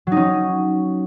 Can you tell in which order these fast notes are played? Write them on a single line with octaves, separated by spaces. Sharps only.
F#3 D#4 C#4